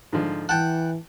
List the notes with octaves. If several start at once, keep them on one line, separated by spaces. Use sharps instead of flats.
G#2 D3 F3
E3 F#5 G5 A5